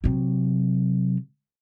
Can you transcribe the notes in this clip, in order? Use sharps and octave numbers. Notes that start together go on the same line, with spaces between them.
C3 F#3